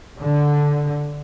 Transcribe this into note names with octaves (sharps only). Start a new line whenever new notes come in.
D3